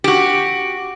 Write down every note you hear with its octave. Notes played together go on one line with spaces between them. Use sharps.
F#4 G4